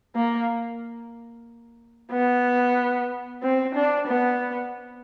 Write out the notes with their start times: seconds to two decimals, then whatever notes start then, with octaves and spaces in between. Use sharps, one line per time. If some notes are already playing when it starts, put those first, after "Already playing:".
0.15 A#3
2.12 B3
3.42 C4
3.75 D4
4.08 B3